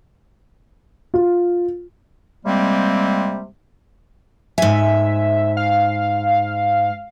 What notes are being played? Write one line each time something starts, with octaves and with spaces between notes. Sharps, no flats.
F4
C3 G3 G#3 A#3 C4
G#2 E5 G#5
F5